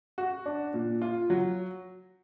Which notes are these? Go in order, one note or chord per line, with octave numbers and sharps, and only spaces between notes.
F#4
D4
A#2
F4
F#3